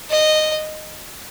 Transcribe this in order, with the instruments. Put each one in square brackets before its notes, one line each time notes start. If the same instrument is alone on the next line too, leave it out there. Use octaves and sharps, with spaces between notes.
[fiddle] D#5